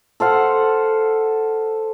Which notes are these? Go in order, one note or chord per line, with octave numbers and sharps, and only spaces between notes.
A4 C5 F5 F#5